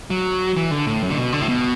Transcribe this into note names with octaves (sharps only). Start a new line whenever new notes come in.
F#3
E3
D3
A2
F#2
D3
B2
D3
A2
B2